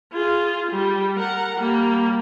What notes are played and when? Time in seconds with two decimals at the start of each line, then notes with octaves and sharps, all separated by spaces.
0.13 F4 G#4
0.71 G3
1.18 A#4 F#5
1.57 G3 A#3